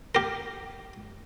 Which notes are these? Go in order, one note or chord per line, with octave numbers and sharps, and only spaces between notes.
G4 A#4